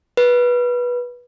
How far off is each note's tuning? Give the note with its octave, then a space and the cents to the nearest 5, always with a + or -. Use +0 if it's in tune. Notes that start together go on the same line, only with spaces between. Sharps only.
B4 -15